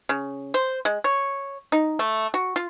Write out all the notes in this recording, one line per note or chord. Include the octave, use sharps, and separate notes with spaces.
C#3
C5
G#3
C#5
D#4
A3
F#4
F4